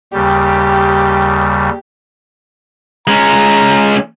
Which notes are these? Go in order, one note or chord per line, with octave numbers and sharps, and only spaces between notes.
D#2 C#3 G3 G4
G#3 C#4 A#5